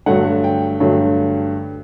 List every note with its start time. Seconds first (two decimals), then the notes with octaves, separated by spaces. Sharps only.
0.06 G2 D3 F#3 A3 F#5
0.44 G5
0.80 G2 D3 F#3 A3